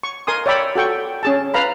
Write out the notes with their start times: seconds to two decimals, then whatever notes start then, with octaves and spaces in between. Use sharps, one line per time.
0.03 C#6
0.27 A#4 G#5 C6 D#6
0.46 C#5 D5 E5 G5 B5
0.76 F#4 A4 G5 C#6
1.23 C#4 G#4 A5
1.54 B4 F5 A#5 B5